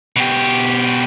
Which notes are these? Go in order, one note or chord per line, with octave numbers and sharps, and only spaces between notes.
B2 G4